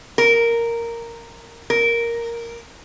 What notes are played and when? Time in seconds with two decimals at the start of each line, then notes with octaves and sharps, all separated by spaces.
0.18 A#4
1.70 A#4